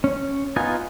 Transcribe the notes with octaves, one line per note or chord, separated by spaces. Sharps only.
C#4
B3 D#4 F4 G#5